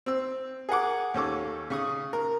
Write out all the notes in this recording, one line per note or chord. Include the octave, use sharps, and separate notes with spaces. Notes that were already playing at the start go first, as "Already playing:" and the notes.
C4 E6
G#4 A#4 F#5 D6
D#2 C#4 A4 D6
C#3 C#6 D#6
A#4